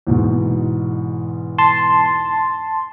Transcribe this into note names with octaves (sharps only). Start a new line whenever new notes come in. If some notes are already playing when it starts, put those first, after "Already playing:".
E2 G#2 B2
A5 C6